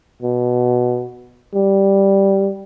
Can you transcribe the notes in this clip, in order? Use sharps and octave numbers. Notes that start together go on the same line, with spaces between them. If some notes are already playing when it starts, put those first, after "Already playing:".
B2
G3